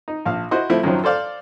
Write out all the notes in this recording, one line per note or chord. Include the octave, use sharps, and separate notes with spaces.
D#4
A#1 F5
E4 F#4 C5 D#5
F3 A3 C4 E4
F#2 D#3 F3 F#3
A4 C5 D5 F5